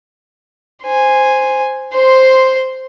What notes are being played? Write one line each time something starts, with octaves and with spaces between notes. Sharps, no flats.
C5 G#5
C5 C6